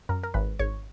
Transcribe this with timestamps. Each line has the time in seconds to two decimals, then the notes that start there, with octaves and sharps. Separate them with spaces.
0.09 F#2 A#4
0.23 A#4
0.34 G#1 B4
0.59 G#1 C#5